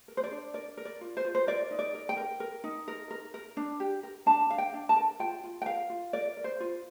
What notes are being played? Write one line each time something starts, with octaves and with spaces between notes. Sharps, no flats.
A#4
C5
D5
D4
A#4 D5
A#4
D5
F4
C5
F4
C5
A#4 D5
D#4
D5
A#4
G5
A#4
A#4
D#4
A#4
A#4
A#4
D4
G4
A#4
D4 A5
D4 F5
G5
D4
A5
A#4
F4 G5
F4
G5
A#4 F5
F4
A#4 D5
A#4
C5
F4